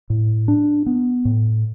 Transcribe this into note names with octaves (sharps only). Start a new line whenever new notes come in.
A2
D4
B3
A2